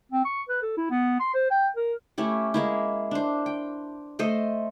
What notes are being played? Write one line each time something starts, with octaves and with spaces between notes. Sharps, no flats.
C4
C#6
B4
A4
E4
B3
C6
C5
G5
A#4
A3 C#4 E4 G4
G#3 A#3 E4
D4 C5
G5
A3 A4 C5 D#5